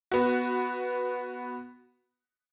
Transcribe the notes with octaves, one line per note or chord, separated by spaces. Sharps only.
B3 F#4